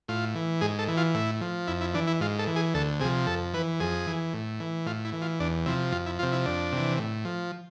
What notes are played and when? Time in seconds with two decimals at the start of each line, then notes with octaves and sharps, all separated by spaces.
0.08 A2 F4
0.35 E3
0.61 G#2 G#4
0.79 A4
0.88 E3
0.97 F4
1.15 A2 E4
1.41 F3
1.67 F2 E4
1.81 E4
1.94 E3 D4
2.07 E4
2.21 G#2 F4
2.39 A4
2.47 E3
2.56 G#4
2.74 D2 A4
3.00 C3 G#4
3.04 F3
3.27 F2 A4
3.54 E3 B4
3.80 F2 G#4
4.07 E3
4.34 A2
4.60 E3
4.86 A2 F4
5.05 E4
5.13 E3
5.22 F4
5.40 E2 D4
5.66 C3 F3 E4
5.92 F2 F4
6.06 E4
6.19 C3 F3 F4
6.32 E4
6.46 F2 D4
6.72 C3 E3
6.98 A2
7.25 F3